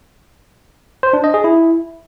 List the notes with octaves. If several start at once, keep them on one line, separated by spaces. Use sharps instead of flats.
C5
D4
D#5
G#4
E4